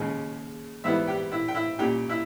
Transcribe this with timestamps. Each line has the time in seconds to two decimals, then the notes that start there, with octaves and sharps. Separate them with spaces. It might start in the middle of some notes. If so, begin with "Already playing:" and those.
Already playing: D#2 C#3 G#3 C#4
0.84 G#2 E3 G3 B3 E4 E5
1.07 G4 G5
1.32 E4 E5
1.48 G5
1.54 E4 E5
1.79 A#2 G3 C#4 G4 G5
2.09 E4 E5